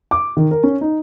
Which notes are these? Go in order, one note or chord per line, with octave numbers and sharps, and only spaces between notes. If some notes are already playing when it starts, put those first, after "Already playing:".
D6
D#3
A#4
C#4
D#4